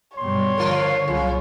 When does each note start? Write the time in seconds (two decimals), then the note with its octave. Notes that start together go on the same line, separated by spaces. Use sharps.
0.18 G2 B2 G3 C#5 C6
0.58 D3 F3 F4 A#4
1.08 C2 A#2 C#3 F#3 F4